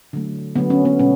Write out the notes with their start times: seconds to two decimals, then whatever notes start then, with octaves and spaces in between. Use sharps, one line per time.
0.13 D3 F#3 A3
0.56 D3 F#3 A3 B3
0.70 C#4
0.85 B3
0.99 B2 G#3 C#4